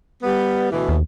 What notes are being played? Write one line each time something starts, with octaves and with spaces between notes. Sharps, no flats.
G3 B3
D2 B2 E3
D#2